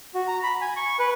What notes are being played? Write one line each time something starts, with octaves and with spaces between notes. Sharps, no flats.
F#4
A#5
B5
G#5
C#6
B4